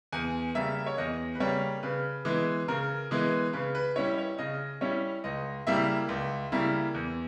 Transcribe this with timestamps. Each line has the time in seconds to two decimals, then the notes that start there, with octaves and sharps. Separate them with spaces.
0.12 E2 G#5
0.55 C#3 G3 A#3 E5
0.86 C#5
0.98 E2 D#5
1.35 B4
1.40 C#3 G3 A#3 C#5
1.83 C#3 B4
2.25 E3 G#3 B3
2.68 C#3 A#4
3.11 E3 G#3 B3
3.53 C#3 B4
3.75 B4
3.96 G3 C#4 E4 C#5
4.18 C#5
4.38 C#3 D#5
4.81 G3 C#4 E4 C#5
5.24 C#2 D#5
5.67 C#3 G3 A#3 E4 E5
6.09 C#2
6.52 C#3 G3 A#3 E4
6.94 E2